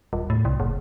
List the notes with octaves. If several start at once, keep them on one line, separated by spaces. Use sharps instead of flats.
D#1
A2
C2
F#1